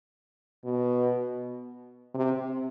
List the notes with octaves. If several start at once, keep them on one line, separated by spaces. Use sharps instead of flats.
B2
C3